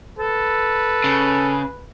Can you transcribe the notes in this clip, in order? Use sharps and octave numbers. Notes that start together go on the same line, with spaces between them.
A4 B4
C#3